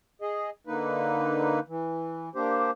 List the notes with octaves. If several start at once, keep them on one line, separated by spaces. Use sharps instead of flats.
G#4 D#5
D3 A#3 D#4 B4
E3
A#3 D4 G4 C5